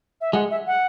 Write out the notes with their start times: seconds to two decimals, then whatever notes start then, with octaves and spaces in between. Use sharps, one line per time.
0.21 E5
0.33 G#3 F#5
0.51 E5
0.67 F#5